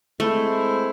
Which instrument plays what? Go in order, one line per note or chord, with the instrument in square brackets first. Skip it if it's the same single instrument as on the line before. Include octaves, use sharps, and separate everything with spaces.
[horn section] G#3 C4 E4 C5 [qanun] A3